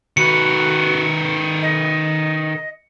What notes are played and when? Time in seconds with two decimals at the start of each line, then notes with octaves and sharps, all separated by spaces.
0.17 D#3 F#4 B4 C#7
1.62 D#5